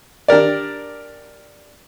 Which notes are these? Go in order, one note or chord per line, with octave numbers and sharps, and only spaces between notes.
D4 G4 A#4 D5